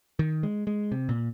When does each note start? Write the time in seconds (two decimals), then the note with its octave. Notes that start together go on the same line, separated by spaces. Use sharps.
0.19 D#3
0.43 G#3
0.67 G#3
0.92 C3
1.09 A#2